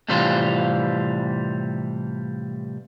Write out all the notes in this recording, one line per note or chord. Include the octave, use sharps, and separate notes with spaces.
A2 C3 E3 G3 C4 F4